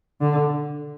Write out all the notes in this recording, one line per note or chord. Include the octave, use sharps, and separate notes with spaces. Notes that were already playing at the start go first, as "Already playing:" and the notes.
D3